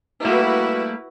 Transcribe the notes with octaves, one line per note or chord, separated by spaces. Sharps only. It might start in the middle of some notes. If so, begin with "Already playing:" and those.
G3 A3 A#3 E4 F#4 B4